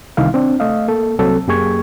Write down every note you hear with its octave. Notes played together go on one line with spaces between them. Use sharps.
C2 D3 D#3 D#4 E4 F5
C4 D4
A3 D#5 F5
A#3 A4
C2 F#3 C4 A4
F#2 A#3 G4 G#4 C#6 G#6